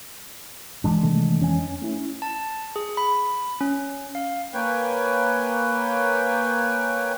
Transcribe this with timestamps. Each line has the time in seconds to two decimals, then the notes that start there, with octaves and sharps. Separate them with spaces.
0.84 E3 G#3 D4
1.03 C3 D#3 A3
1.40 F2 C#4 G#5
1.82 A3 C#4 E4
2.22 A5
2.76 G#4
2.97 B5
3.61 C#4
4.15 F5
4.54 A#3 B4 C#5 G5 G#5